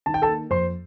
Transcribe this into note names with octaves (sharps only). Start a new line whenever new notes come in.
D#3 A5
G5
A4 A5
A#3
F2 C5 C6